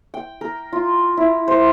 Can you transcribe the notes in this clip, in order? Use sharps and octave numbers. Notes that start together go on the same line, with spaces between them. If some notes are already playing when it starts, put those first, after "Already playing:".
G5
A#4
F4
E4
C5